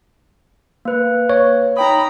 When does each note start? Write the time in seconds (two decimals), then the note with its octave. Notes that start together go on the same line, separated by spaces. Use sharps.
0.85 A#3 B4
1.30 C#5
1.77 D#4 G5 A#5 B5 D#6